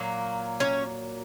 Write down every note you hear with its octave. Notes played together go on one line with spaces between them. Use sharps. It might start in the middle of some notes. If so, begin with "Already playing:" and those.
Already playing: A#2 F#3 A#3
C#4 C#5